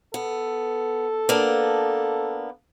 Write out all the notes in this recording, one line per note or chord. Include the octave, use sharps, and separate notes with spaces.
B3 A4
A#3 B3 D4